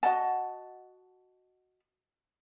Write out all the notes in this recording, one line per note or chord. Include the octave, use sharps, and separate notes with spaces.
F#4 D#5 F#5 A5